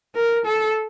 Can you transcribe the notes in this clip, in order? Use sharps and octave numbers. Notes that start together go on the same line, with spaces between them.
A#4
A4